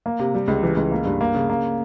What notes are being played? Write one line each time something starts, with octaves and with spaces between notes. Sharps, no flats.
A#3
C3
G3
C#2
E3
C#2
A#3
G2
A#3
C#3
A#3